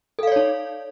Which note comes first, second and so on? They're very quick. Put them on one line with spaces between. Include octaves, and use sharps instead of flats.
A4 F5 D5 C#5 D#4